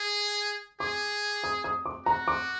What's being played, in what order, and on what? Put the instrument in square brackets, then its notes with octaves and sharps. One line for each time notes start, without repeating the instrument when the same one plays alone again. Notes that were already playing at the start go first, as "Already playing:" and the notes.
Already playing: [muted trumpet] G#4
[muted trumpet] G#4 [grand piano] D6
[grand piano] D#6
D#6
D6
[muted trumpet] F#4 [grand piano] A#5
[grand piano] D6